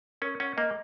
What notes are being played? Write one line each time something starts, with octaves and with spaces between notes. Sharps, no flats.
C#4 A#4
C#4 F#5
A#3 D#5